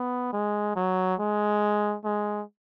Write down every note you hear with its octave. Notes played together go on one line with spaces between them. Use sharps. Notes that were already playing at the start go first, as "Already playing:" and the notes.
Already playing: B3
G#3
F#3
G#3
G#3